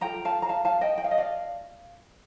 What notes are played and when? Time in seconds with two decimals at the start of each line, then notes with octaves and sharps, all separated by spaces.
0.01 F4 A4 G5 A#5
0.25 F5 A5
0.42 A#5
0.49 F5 A5
0.65 F5 A5
0.81 D#5 G5
0.98 G5
1.04 F5
1.11 D#5
1.18 D5 F5